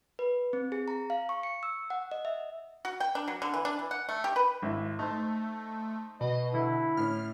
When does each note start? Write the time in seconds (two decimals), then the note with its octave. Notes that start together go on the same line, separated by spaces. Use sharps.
0.19 B4
0.53 C4
0.72 G#4
0.88 A#5
1.10 F5
1.29 C#6
1.43 C#7
1.63 E6
1.90 F#5
2.12 D#5
2.25 E5
2.85 F#4
3.00 G5
3.15 D4
3.28 F#3
3.42 D3
3.54 E3
3.65 D4
3.79 E3
3.91 F#5
4.09 A3
4.24 G4
4.36 B4
4.62 G#1 E4 E5
4.99 A3 D#4 C5
6.20 B2 D#5
6.54 D3 E4
6.97 A2 C#4 F6